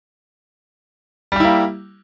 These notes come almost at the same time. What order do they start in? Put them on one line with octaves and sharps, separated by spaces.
G3 G4 E4 A#3